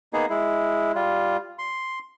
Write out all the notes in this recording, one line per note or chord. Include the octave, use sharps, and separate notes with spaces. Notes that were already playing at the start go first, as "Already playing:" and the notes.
A#3 B3 D#4 G#4
G#3 E4
G3 F4
C6